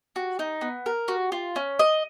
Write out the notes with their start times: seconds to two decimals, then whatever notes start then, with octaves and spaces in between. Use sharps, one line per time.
0.16 F#4
0.39 D#4
0.61 B3
0.86 A#4
1.08 F#4
1.32 F4
1.56 C#4
1.79 D#5